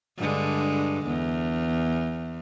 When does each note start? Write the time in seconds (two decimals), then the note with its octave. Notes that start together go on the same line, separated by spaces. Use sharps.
0.18 G2 D3 G#3
1.07 E2